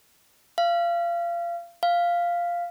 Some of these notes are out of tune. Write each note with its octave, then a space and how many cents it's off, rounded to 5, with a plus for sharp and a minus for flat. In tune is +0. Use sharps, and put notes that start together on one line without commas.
F5 -25
F5 -5